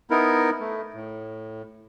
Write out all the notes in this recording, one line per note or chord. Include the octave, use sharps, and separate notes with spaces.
B3 D#4 E4 A#4
A3
A2